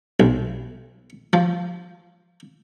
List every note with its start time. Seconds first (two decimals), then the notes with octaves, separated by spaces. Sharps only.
0.20 B1
1.33 F3